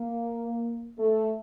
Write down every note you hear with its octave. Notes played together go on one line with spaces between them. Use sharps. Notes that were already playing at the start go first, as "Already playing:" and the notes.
Already playing: A#3
A3